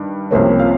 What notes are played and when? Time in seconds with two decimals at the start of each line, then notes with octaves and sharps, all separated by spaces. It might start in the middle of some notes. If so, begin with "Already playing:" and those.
Already playing: G2 D#3
0.31 C2 C3 F3 A#3 C#4
0.59 F4 F5